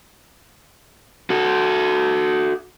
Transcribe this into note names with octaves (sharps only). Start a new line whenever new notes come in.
F#4 A4